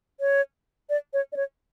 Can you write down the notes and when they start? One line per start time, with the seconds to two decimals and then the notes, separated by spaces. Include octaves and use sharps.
0.20 C#5
0.90 D5
1.13 C#5
1.32 D5
1.36 C#5